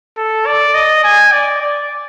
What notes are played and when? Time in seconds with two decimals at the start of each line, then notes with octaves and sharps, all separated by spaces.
0.17 A4
0.46 D5
0.75 D#5
1.04 G#5
1.32 D5
1.61 D5